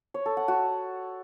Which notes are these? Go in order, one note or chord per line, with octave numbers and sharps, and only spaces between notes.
C#5
A4
F#5
F#4